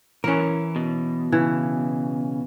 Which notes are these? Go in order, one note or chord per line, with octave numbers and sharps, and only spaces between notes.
E3 C#4 A#4
B2
C#3 E3